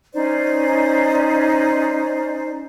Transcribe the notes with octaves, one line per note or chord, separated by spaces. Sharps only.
C#4 D#4 C5 D5